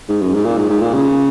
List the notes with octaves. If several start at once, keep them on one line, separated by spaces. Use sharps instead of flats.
G#2
F#2
G#2
A#2
G#2
G#2
A#2
C#3